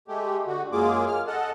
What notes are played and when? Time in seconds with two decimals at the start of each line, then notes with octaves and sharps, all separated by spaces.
0.08 G#3 A3 G4
0.47 D3 F#4
0.72 F#2 G#3 A#3 F4 G#4 D6
1.07 F6
1.27 A4 D#5 F#5 A5